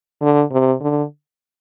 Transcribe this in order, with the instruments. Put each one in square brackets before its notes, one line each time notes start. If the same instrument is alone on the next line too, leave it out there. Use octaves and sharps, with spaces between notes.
[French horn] D3
C3
D3